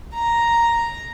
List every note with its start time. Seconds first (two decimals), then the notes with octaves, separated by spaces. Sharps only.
0.15 A#5